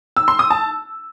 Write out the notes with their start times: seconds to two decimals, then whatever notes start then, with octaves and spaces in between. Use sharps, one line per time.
0.17 E6
0.28 C6
0.39 D#6
0.51 A5